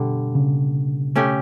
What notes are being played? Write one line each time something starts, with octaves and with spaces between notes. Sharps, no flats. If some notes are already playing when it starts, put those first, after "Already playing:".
Already playing: B2 D3 G3
C#3
A3 C#4 G4